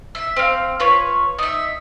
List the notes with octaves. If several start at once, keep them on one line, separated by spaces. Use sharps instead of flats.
E5
C4 F5
F4 B4 C#5
D#4 E5